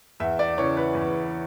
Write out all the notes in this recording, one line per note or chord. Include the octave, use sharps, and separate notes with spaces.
E2 E5
D5
C#3 E3 C#5
B4
E2